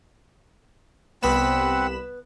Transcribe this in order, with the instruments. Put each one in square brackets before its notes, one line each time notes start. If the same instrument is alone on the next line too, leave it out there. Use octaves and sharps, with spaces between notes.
[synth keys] C2 B5 E7 [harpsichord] B3 [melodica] C4 B4 F#5